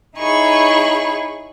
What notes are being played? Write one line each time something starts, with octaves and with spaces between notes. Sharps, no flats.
D#4 E4 G#4 C#5 B5 C#6